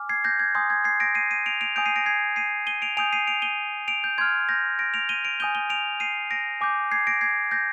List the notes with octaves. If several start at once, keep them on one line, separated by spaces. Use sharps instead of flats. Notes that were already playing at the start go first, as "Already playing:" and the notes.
Already playing: G#5 D6 F6
G#6 C7
G6 A#6
G#6
G#5 C6 D#6 G6
G#6
G#6 C7
A#6 D7
C7 D#7
C7 D#7
D7 F7
D7 F7
G#5 D#6 G6 D7 F7
C7 D#7
A#6 D7
G#6 C7
C7 D#7
D#7 G7
D7 F7
G#5 D#6 G6 D7 F7
C7 D#7
D7 F7
D#7 G7
D7 F7
G6
C6 F6 G#6
G6 A#6
A#6 D7
D7 F7
D#7 G7
D7 F7
G#5 D#6 G6 D#7 G7
D#7 G7
D7 F7
C7 D#7
A#6 D7
G#5 D6 G6
G#6 C7
A#6 D7
G#6 C7
G6 A#6